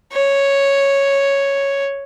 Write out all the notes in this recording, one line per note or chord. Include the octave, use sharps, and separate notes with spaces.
C#5